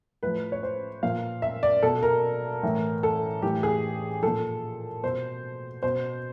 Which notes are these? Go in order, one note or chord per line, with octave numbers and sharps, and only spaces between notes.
A2 F3 B4
C#5
C5
A#2 F3 F5
E5
D5
B2 A4
A#4
A2 E3
A4
A2 E3 G4
G#4
A#2 F3 A4
B2 C5
B2 C5